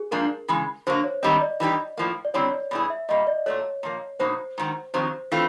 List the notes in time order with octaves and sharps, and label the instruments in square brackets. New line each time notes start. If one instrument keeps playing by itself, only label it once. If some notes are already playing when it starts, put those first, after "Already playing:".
Already playing: [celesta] G#4
[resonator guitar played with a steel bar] G#2 F3 A#3 D4 [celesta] A#4
[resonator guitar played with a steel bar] C#3 E3 G#3
[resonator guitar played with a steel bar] D3 F#3 A#3 [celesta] C5
[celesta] C#5
[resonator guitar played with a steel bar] G#2 D#3 G3 C4 [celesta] D#5
[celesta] D5
[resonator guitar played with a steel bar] E3 G3 B3 D#4 G4
A2 F3 A#3
[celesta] D5
[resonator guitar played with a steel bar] F#2 D3 G3 C4 E4 [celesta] C#5
[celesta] D5
[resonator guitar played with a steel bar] B2 G3 B3 E4 G#4
[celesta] E5
[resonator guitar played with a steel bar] A#2 G3 A#3 [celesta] D#5
[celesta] D5
[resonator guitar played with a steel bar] A#2 F#3 A3 [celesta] C#5
[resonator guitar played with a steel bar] A#2 F3 A#3
[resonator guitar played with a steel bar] B2 F#3 A#3 D#4 [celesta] C5
[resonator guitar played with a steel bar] G#2 D#3 F#3
[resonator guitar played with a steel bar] F2 C3 D#3 F#3 [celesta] C5
[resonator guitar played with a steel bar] E3 A3 C4 F4